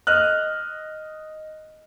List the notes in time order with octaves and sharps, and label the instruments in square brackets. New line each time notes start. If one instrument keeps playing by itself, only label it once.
[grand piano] D#5 F6 F#6